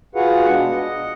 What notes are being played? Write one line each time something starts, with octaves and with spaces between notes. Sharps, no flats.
F4 F#4 G#4 B4 F5 F#5
B2 G#3 D4 F#5
D#5 F#5